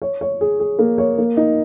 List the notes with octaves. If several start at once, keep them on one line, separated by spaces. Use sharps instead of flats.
C#5
C#5
G#4
G#4
A#3
C#5
A#3
D#4